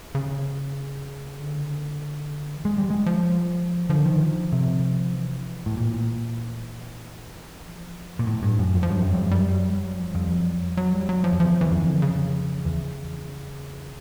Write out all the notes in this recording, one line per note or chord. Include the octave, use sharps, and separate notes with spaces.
C#3
D3
E3
D#3 G#3
G3
E3 G#3
F3
D3 F3
D#3
C3
E3
A2
A#2
F3
A#2
A2
G2
F#2
F2
F3
G2 F#3
F#2
F2 G3
F#2
G3
F#3
G3
F#3
F3
F2 G3
F#3
F#3
G3
F#3
F3
F2
E2 F3
E2 E3
F2
D3
C#3
E2